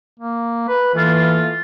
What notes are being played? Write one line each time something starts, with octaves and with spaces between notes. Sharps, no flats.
A#3
B4
E3 A3 A#3 F4